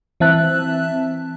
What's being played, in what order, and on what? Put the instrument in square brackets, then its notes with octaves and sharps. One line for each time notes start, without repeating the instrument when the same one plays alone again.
[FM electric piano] E3 C4 E5 A5 F#6